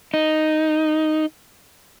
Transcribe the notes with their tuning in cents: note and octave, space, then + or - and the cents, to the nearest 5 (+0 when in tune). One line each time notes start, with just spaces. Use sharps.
D#4 +0